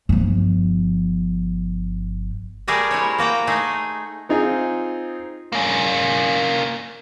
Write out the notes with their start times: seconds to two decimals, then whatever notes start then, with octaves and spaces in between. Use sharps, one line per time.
0.09 G1 F3
2.68 G3 A3 G#4 A#4 D5 E5
2.91 E4 C5 C#5
3.18 A#3 F#4 G5 A#5
3.47 A3 D#4 G#4
4.29 C4 D#4 F4 G#4
5.52 A#3 C#4